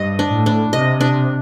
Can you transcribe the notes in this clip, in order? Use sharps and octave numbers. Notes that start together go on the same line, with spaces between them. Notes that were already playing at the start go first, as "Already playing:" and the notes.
Already playing: G2 D#5
D4
A2
D4
C3 D#5
D4